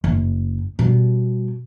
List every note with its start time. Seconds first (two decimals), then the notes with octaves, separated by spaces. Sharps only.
0.04 F#1
0.79 B2 G3